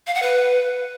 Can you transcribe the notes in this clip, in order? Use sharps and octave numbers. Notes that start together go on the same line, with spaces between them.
F5
F#5
B4